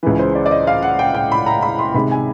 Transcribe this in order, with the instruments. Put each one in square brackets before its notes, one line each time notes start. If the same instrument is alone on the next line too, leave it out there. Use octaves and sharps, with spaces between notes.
[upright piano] C#2 C#3 E3 B4
C5
D5
D5
D#5
F5
F#5
G5
G5
B5
A#5
B5
C6
C3 D#3 G#3 B5
G#5